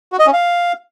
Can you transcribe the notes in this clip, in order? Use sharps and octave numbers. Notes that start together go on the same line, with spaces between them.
F#4
D#5
C#4
F5